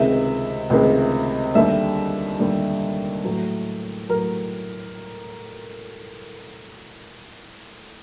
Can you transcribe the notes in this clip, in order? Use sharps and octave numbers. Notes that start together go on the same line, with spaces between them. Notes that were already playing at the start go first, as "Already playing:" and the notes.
Already playing: C#2 C3 D#3 G#3 E5
C#2 C3 D#3 G#3
D#2 D3 G3 E5
D#2 D3 G3
A2 F#3
A2 F#3 A#4